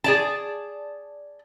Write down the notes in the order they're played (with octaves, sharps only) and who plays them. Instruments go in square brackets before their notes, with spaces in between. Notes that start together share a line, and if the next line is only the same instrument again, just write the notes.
[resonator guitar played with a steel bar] G#4 D5 A5